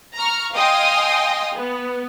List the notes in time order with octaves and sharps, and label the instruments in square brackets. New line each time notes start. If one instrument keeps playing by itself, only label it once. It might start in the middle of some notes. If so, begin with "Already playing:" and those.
[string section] A#5 C#6 F6
D#5 F5 G5 G#5 C6 D#6
B3